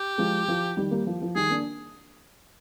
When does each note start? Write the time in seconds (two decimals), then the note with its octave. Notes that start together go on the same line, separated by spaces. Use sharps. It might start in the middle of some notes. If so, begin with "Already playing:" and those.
Already playing: G4
0.18 F3 G#3
0.48 F3
0.77 D#3 G3
0.91 G3 A#3
1.07 F3
1.22 F3
1.35 D#3 G3 G#4
1.50 A#3 D4